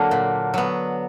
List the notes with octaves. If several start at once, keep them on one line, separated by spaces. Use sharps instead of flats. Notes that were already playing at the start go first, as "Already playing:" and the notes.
Already playing: D3 F#3 A#3 D4
A#2
F#3 B3